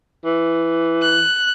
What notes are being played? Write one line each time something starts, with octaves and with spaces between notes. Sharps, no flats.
E3
F#6